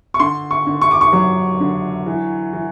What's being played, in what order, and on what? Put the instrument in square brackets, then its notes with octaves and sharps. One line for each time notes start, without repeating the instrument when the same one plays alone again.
[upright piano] C#6
D3 C6
C#6
D3
C#6
D6
C#6
F#3
D3
E3
E3